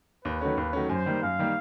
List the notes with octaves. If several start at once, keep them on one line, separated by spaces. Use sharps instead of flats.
D#2 B4
D#3 F#3 A3 C#4
D#2
D#3 F#3 A3 C#4
F#2 C5
D#3 G3 A#3
F#2 F5
D#3 G3 A#3